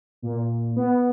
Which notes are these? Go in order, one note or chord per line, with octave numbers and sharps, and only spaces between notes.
A#2
B3